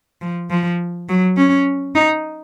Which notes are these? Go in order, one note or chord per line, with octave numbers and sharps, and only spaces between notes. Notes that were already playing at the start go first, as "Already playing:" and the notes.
F3
F3
F#3
C#4
D#4